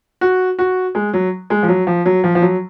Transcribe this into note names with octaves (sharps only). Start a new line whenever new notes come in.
F#4
F#4
G#3
F#3
G#3
F3
F#3
F3
F#3
F3
F3
F#3